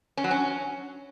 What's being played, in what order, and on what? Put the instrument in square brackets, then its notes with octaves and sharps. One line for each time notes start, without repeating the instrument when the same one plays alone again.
[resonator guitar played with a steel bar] C#4
F#3
C#4